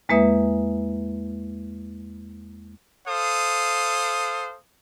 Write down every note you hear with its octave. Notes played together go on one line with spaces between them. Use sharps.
E2 G#3 A#3 B4 E5 D#6
A4 C5 F5 D#6